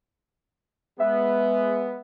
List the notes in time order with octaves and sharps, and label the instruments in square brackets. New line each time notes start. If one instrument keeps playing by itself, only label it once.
[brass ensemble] G#3 B3 [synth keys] E5